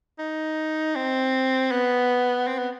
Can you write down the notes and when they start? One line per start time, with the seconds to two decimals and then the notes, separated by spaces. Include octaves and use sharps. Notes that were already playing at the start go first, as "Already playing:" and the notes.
0.19 D#4
0.96 C4
1.71 B3
2.47 C4
2.58 B3